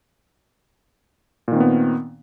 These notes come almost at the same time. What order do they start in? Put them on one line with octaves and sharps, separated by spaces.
A#2 D#3 C4 B3